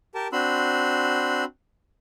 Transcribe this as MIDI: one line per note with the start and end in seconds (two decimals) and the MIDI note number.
0.15 0.28 67
0.15 0.28 70
0.15 0.28 81
0.33 1.44 60
0.33 1.44 62
0.33 1.44 66
0.33 1.44 83
0.33 1.44 84
0.33 1.44 88